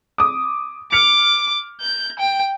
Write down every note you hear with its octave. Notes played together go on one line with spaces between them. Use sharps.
D6 D#6
D6 F6 C#7 F7
G6
G5